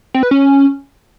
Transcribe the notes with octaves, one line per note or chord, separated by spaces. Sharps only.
C4
B4
C#4